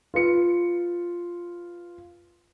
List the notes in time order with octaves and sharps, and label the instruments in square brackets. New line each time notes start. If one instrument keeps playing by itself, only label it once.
[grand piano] F4 B4 C#7